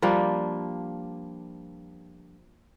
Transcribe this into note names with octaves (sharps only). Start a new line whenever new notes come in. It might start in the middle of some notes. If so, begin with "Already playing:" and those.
F3 G3 A#3 D4